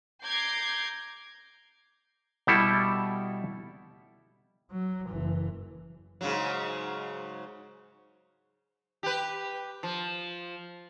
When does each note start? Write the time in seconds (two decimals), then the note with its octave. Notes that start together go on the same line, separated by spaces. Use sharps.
0.23 A#5 D6 G6 G#6 C7
2.47 B2 G3 E4 A4
4.71 F#3
5.09 F#1 E3
6.21 G#2 C#3 F#3
9.03 G4 B4
9.83 F3